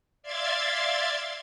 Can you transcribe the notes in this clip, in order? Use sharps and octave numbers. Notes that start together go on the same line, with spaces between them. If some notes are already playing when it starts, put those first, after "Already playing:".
D5 E5 F5 C6 G#6 A6